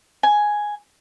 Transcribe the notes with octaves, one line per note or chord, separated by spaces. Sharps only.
G#5